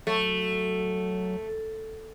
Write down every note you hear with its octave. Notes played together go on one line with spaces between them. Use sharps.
F#3 A3